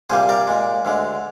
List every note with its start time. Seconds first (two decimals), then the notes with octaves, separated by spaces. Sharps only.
0.10 C2 A#2 G3 A#3 G#4 C5
0.29 A#4 D5
0.47 A#2 G#3
0.85 D2 D3 G#3